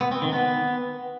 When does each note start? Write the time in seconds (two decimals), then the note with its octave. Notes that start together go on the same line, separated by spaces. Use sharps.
0.01 B3
0.11 C4
0.22 D#3
0.33 B3